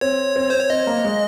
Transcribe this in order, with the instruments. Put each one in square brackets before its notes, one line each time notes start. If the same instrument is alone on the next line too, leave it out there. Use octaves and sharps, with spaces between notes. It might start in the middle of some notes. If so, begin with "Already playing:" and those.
[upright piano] C4 [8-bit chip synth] C#5
[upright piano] C4
[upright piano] C4 [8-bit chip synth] C5
[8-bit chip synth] C#5
[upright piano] C4 [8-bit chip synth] D#5
[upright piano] A#3
G#3